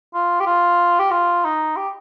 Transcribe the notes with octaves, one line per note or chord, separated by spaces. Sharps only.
F4
G4
F4
G4
F4
D#4
G4